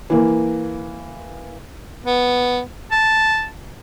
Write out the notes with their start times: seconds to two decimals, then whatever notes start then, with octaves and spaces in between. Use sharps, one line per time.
0.10 E3 A#3
2.06 B3
2.92 A5